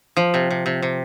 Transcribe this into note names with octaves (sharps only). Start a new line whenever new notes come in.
F3
C3
C3
C3
C3